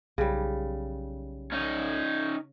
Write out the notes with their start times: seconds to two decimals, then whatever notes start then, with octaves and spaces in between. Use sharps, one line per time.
0.18 B1 C#3 G3
1.52 C#4 D#4